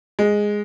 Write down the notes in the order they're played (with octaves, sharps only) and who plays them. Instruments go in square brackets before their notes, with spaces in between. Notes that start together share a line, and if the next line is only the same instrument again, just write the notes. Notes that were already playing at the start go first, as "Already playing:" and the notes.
[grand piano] G#3